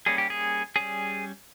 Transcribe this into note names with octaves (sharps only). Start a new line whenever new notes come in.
G3 A#3 C#4 G#4
G4
G#4
G3 C#4 G#4